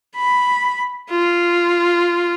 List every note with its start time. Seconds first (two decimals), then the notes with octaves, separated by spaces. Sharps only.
0.16 B5
1.10 F4